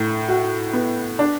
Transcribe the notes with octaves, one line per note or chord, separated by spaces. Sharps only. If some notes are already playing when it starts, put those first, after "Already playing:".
Already playing: A2
F#4
B3
D4